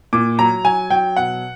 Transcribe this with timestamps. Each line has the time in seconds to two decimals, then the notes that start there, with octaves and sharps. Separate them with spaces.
0.13 A#2 D6
0.39 F#3 A#5
0.65 F#3 G#5
0.90 F#3 G5
1.16 B2 F#5